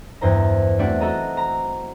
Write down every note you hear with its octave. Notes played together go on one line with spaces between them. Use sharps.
E2 G2 C5 A#5
A3 C4 D4 F#4 D5 F#5
F#4 A4 D#5 A#5
A#5